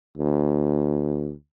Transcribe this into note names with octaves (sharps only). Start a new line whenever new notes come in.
D2